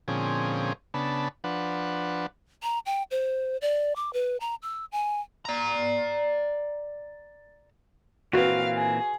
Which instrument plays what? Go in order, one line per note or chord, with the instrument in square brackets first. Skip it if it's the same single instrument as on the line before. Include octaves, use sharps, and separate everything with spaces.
[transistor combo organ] A#2 D3 F3 C4 C#4 G#4
C#3 B3 D4 A5 B5
F3 D4 B4 F#5
[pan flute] A#5
G5
C5
D5
D6
B4
A#5
E6
G#5
[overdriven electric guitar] D5 A#5
[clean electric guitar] A#2 E3 C4 [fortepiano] F#4 B4 [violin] F5
[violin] G#4